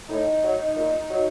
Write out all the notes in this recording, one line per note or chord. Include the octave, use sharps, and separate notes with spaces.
A2 D#4
F#3
A#2
F#3